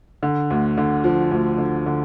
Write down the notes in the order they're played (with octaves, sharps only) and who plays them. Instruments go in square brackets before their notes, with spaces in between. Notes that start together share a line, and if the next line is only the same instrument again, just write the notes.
[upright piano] D3
D2
D3
F3
D2
D3
D3